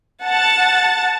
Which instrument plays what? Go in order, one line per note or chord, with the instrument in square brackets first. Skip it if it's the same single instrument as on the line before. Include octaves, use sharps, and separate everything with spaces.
[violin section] F#5 A5 A6